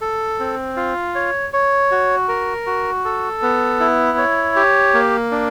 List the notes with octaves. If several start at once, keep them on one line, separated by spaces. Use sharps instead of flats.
A4
C4
F4
C#5
C#5
F#4
A#4
F#4
A4
B3
E4
C#5
G4
A#3
D4